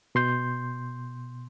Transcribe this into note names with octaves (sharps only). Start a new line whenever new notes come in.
B2 C6 G6